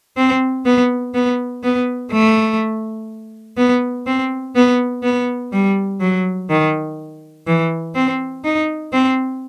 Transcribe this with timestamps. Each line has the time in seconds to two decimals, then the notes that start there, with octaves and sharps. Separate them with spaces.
0.17 C4
0.65 B3
1.14 B3
1.63 B3
2.12 A3
3.57 B3
4.06 C4
4.55 B3
5.03 B3
5.52 G3
6.01 F#3
6.49 D#3
7.47 E3
7.95 C4
8.44 D#4
8.93 C4